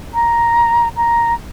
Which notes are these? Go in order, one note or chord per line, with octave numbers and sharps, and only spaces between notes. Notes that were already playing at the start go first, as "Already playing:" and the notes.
A#5
A#5